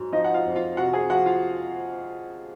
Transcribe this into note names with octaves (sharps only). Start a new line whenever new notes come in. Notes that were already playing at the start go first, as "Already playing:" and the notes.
Already playing: G#2 F#3
F3 D#4 D#5
F#5
F4 F5
F2
F4 F5
C3 F#4 F#5
G#4 G#5
F3 F#4 F#5
F4 F5